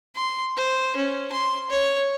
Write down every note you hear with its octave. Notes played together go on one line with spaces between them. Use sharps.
C6
C5
C#4
C6
C#5